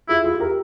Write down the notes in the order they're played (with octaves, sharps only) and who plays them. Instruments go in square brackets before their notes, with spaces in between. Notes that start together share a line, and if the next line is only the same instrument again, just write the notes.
[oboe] E4 [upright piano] F4 G#4
[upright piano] F4 G#4
G#4
G4 A#4